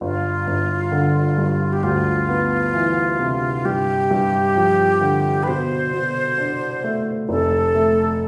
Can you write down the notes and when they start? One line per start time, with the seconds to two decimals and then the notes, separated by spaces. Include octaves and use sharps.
0.01 G1 F4
0.47 G1
0.92 D3
1.38 G2
1.73 G4
1.83 D2 F4
2.29 B3
2.74 E3
3.20 C3
3.65 G2 G4
4.11 G2
4.56 F3
5.01 D3
5.43 B4
5.47 B2 C5
5.93 B2
6.38 D4
6.84 A3
7.29 F1 A4
7.74 A3